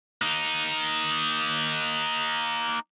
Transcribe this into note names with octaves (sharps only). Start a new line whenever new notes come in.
A#3 D#4